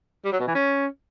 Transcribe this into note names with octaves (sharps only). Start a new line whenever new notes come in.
G3
F#3
B2
E3
C#4